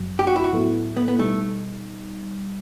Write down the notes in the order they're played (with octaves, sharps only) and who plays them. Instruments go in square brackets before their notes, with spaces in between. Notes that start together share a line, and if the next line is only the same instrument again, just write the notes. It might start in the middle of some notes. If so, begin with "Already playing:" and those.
Already playing: [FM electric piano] G1 F#2 F#3
[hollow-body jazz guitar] G4
F#4
E4
F#4
[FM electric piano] A2 F#3 B3 E4 A4
[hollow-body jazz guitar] B3
B3
[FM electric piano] B2 G3 D#4 [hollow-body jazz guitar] A3